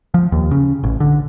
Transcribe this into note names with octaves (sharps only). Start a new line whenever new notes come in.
F3
D#2
C#3
A1
D3